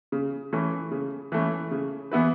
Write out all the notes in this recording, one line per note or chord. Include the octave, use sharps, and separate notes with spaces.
C#3
E3 A3 C#4
C#3
E3 A3 C#4
C#3
E3 B3 E4 B4